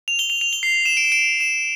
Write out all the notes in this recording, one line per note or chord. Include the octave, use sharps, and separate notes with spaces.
F7
G7
F7
F7
G7
C7
E7
D7
E7
D7
E7